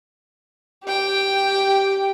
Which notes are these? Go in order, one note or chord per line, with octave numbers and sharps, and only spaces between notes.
G4 G5